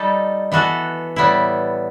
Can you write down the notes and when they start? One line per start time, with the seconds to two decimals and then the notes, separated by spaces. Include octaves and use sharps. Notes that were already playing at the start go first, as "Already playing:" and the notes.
Already playing: G3 D#4 A4
0.52 E3 B3 F#4 A4
1.16 A2 G3 B3 E4